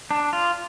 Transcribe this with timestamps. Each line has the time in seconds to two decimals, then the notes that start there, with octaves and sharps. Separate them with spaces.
0.11 D4
0.33 F4